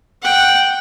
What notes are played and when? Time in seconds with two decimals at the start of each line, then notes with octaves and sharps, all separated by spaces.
0.22 F#5 G5